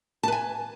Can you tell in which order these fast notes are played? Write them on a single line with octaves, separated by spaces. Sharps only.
A5 B4 G#5